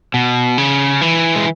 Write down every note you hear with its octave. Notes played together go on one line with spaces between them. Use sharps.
B2
C#3
E3
G#3